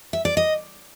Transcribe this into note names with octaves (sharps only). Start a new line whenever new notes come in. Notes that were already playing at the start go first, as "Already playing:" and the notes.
E5
D5
D#5